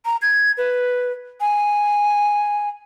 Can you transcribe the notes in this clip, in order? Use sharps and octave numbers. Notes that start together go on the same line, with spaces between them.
A#5
G#6
B4
G#5